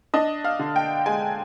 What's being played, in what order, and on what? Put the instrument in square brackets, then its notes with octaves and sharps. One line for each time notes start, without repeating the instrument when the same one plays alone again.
[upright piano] D4 D#5
F5
D3
G5
G#3 G#5